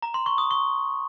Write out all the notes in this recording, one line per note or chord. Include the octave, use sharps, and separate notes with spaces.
A#5
C6
C#6
D#6
C#6